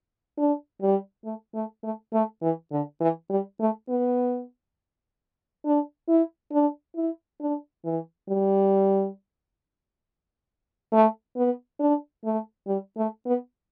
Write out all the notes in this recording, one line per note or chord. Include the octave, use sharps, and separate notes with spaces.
D4
G3
A3
A3
A3
A3
E3
D3
E3
G3
A3
B3
D4
E4
D4
E4
D4
E3
G3
A3
B3
D4
A3
G3
A3
B3